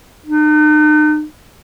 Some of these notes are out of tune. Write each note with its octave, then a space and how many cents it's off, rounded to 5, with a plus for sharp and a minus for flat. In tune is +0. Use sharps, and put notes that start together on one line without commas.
D#4 -45